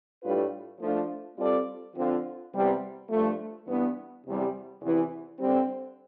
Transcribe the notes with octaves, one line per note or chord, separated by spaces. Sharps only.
A2 G3 D4 F4 B4
F3 A3 D4 F4
G3 C4 F4 A4 D5
D3 F3 C4 F4
E2 C3 G3 B3
G2 F3 A3
G2 E3 B3
E2 C3 G3
E2 C3 E3
G2 D3 G3 C4